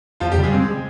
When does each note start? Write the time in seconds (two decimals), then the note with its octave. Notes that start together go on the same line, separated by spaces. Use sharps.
0.20 E2 F3 F4
0.29 F2 G3 G4
0.38 C#3
0.43 G3 G#3 G#4
0.54 C4